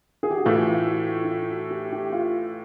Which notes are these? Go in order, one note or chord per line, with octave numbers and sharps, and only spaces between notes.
G#4
G4
F#4
A2 E3 A3 F4
F4
F#4
F4
E4
F4
F#4
G4
G4
F4